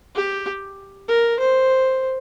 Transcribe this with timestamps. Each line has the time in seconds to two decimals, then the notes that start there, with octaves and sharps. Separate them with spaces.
0.15 G4
1.08 A#4
1.39 C5